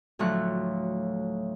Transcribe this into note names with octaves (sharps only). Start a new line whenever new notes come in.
D2 A2 F3 F#3 A3 F#6